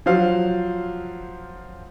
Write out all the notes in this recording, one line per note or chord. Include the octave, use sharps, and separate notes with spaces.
F3 F#3 C5 F5